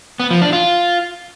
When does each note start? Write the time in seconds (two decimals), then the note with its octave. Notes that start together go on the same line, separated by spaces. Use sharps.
0.20 B3
0.31 F3
0.42 D4
0.53 F4